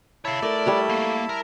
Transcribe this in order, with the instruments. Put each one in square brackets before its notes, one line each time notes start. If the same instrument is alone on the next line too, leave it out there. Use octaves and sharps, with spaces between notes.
[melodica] E4 A5 B5 [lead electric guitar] C#5 F5
[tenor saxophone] A3 [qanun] A#4 [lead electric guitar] D5
[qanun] G3 C#5 F#5
[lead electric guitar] A#3
A#4